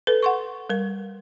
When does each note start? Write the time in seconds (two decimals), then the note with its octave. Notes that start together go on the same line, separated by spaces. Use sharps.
0.07 A4 B4
0.23 F#5 C6 C#6
0.70 G3 A#4